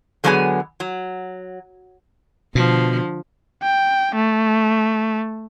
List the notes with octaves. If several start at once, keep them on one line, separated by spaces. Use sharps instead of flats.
D3 F#3 G#3 B3 G#4 G#5
F#3
B2 D3 F3
G5
A3